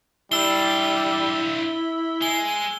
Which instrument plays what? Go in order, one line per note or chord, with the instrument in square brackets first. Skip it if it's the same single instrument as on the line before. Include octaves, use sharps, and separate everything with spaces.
[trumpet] G3 [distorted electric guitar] D4 F4 [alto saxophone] E4 [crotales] E6 G7
[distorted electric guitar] G#3 [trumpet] G#5 [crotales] G7